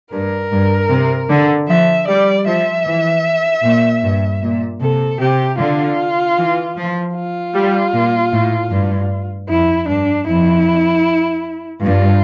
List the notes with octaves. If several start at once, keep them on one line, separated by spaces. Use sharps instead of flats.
G2 A#4
G2
C3
D3
F3 E5
G3 D5
F3 E5
E3
A#2
G2
A#2
C3 A4
C3 G4
D3 F4
E3
F3
F4
G3
A#2
A2
G2
F2 E4
G2 D4
F2 E4
G2 F4